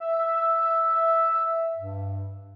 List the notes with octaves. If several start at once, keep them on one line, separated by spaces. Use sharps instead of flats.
E5
G2